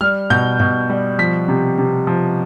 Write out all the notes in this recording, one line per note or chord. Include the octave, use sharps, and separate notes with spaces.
G3 F6
B2 G6
B2
G3
F3 B6
C3
C3
F3